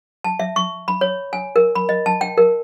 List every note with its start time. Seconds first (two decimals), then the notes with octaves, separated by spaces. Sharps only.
0.24 A5
0.39 E5
0.56 C#6
0.88 B5
1.01 C#5
1.33 G#5
1.56 A#4
1.75 B5
1.89 D#5
2.06 A5
2.21 G5
2.38 A#4